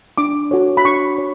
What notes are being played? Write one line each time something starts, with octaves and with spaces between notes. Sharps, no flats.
D4 D6
F#4 A4 C#5
B5
D4 C#6
C#5